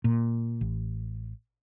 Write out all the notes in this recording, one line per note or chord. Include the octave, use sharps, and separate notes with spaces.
A#2
A1